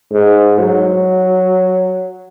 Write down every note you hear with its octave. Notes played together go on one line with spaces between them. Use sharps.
G#2
F#3